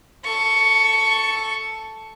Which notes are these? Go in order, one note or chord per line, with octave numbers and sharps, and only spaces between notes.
A4 C#6